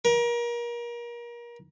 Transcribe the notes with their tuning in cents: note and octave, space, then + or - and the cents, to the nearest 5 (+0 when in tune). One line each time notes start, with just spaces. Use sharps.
A#4 +30